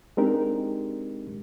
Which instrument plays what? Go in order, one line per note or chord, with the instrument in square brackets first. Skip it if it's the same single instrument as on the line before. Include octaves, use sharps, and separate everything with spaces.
[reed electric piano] G#3 C4 D4 D#4 G4 A#4